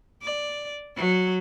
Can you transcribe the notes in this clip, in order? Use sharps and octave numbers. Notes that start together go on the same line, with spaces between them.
D5
F#3